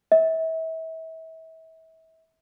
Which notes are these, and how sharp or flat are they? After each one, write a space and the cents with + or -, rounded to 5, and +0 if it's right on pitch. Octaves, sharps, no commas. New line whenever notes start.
E5 -35